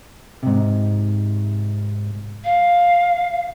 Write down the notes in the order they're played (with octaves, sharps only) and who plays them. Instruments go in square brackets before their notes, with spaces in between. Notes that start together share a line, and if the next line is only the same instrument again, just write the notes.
[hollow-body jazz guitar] G#2 C3
[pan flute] F5